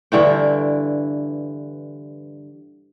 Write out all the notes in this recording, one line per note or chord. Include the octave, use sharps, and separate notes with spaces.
G2 D3 E3 G5